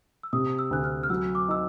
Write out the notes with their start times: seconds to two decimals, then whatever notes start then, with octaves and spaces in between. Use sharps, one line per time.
0.23 E6
0.33 C3 D#6
0.59 E6
0.71 D2 F#6
0.84 F6
1.03 F6
1.10 F#3 E6
1.35 D6
1.49 D#4 E6